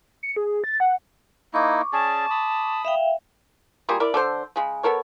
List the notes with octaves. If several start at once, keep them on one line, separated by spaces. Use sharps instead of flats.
C#7
G#4
A6
F#5
A#3 D#4 E4 C#6 D6
C#4 G#4 D5 A5
B5 D#6
E5 F5 G5
G3 A#3 F4 G#4
E4 A#4 D5
D3 A4 C5
C#3 G#3
B3 A4 A#4 C#5